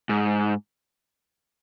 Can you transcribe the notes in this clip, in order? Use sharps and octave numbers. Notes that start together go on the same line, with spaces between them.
G#2